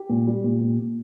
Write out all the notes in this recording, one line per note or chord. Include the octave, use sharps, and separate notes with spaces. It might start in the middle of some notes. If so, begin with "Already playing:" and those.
Already playing: G4
A#2
G3
A#2
A#2
A#2